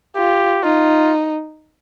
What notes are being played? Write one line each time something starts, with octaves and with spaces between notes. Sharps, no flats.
F4 G4
D#4 F4